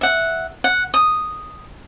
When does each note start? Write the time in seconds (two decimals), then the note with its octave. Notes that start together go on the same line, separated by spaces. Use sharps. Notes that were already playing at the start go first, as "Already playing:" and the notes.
0.01 E5 F#5
0.64 F#5
0.94 D#6